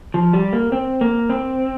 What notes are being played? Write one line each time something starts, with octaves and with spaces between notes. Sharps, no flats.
F3
G3
A#3
C4
A#3
C4